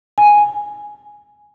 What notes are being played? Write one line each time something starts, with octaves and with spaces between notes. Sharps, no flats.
G#5